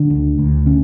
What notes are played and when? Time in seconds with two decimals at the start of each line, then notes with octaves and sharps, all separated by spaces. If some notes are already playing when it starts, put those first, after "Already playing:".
Already playing: D3 D4
0.10 D2
0.38 D2
0.66 D3 C#4